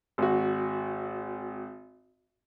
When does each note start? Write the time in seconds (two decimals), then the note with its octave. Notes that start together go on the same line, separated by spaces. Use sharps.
0.18 G#1 F#4